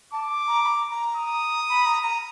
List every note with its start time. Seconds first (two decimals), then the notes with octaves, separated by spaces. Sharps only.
0.12 A5 D6
0.48 A#5
0.64 B5
0.68 A#5
0.91 A#5
1.17 D#6
1.69 B5
1.86 A#5
2.03 A#5